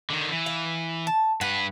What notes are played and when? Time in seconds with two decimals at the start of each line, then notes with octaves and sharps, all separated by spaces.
0.10 D3 D#3
0.32 E3
0.46 F5
1.07 A5
1.41 G2 B4 F#5